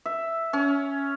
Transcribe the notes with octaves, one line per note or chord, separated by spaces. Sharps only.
E5
C#4